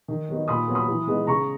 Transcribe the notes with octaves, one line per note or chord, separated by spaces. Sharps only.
D#3
F#3 B3 D#4
A#2 B5 D#6
F#3 B3
B5 D#6
E3
G#3 B3 D#4
C#3 A#5 C#6